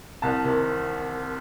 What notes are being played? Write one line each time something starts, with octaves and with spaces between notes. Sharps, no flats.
C2 A5
C3 D#3